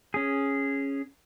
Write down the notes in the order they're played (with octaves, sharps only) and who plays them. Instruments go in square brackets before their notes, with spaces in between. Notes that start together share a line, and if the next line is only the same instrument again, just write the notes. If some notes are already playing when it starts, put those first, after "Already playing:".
[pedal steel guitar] C#4 G#4